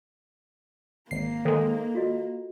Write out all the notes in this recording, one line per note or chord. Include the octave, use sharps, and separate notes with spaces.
G#1 A#3 C7
D#3 G#3 A4 A#4 C5
F4 F#4 D#5